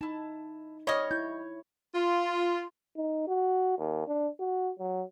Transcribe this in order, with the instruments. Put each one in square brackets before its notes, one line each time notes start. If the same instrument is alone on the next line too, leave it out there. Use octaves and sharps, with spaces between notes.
[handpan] D#4 [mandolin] E4 A5
[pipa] G3 D#5 [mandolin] C#4 D#6 F6 [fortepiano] C#5
[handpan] E4 [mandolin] G6
[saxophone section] F4
[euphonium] D#4
F#4
D#2
D4
F#4
F#3